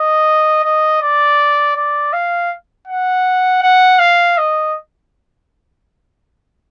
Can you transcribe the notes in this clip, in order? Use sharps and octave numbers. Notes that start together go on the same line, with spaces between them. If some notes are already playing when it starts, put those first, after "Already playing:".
Already playing: D#5
D#5
D5
D5
F5
F#5
F#5
F5
D#5